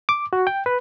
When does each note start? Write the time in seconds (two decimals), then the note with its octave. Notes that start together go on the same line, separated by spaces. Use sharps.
0.09 D6
0.33 F#4
0.47 G5
0.66 B4